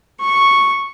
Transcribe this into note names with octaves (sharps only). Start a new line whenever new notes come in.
C#6